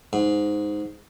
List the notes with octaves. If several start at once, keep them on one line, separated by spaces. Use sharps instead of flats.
G#2